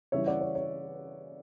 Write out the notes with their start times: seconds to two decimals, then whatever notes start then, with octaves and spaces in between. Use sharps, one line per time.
0.12 C#3 E3 G3 C#5 E5
0.26 D5 F#5
0.41 C#5
0.55 C#5